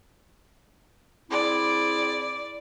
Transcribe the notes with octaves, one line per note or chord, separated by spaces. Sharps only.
C4 E4 G#4 D5